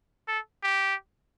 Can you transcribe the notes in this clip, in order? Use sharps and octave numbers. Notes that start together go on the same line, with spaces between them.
A4
G4